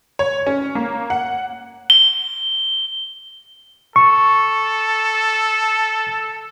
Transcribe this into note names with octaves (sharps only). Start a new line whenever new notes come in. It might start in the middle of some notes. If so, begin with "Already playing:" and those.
C#5
C#4
A#3
F#5
G7
A4 C#6